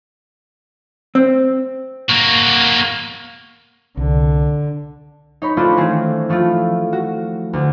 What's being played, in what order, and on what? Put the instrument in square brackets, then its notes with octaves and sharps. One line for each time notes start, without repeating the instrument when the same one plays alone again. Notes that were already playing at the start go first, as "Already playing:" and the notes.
[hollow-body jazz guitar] C4
[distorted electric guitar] A#3 F#4
[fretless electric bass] C2 [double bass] D3
[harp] D#4 C#5 B5
A3 C4 D4 E4 F4 A4
D#3 E3 A3 C4 G#4
F3 A3 E4 F4
F#4
D2